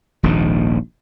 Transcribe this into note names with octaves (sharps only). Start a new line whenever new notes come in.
D#1 A#1 G#2 D#3